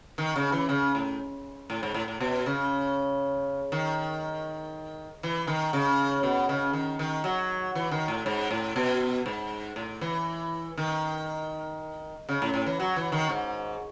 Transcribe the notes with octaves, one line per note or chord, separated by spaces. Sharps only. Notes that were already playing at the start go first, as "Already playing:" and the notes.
D#3
C#3
E3
C#3
A2
A2
G#2
A2
A2
B2
C#3
D#3
E3
D#3
C#3
B2
C#3
D#3
D#3
F#3
E3
D#3
A2
G#2
A2
B2
G#2
A2
E3
D#3
C#3
A2
A2
E3
F#3
E3
D#3
G#2